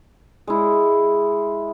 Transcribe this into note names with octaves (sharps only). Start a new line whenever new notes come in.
G#3 E4